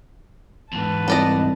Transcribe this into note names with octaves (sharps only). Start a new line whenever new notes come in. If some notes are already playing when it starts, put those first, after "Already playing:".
E2 G#2 B4 A5
C2 A4 D5 D#5